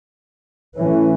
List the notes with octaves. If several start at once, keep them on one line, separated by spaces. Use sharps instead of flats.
A2 E3 A3 C#4